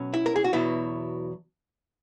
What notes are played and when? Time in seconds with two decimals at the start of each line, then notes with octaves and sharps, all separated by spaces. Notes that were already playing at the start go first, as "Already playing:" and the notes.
Already playing: B2 F#3 C#4
0.14 E4
0.26 A#4
0.36 G#4
0.44 F#4
0.53 E2 B2 F#3 E4